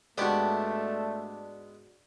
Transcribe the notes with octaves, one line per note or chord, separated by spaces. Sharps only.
G#2 A3 B3 D4 F#4 G4 D5